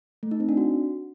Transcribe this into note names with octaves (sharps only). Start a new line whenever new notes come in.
A3
D#4
C4
D4
F#4